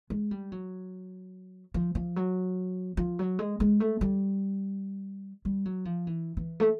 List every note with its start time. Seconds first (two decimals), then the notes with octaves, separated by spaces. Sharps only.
0.10 G#3
0.31 G3
0.52 F#3
1.74 F3
1.95 F3
2.16 F#3
2.97 F3
3.19 F#3
3.39 G#3
3.60 G#3
3.80 A3
4.01 G3
5.45 G3
5.65 F#3
5.85 F3
6.07 E3
6.37 E3
6.60 A3